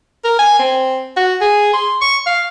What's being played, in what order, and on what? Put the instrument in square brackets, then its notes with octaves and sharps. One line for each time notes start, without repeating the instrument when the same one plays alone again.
[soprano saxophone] A#4
G#5
C4
F#4
G#4
C6
C#6
F5